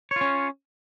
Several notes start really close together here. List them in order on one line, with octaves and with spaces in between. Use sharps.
C#5 F4 C#4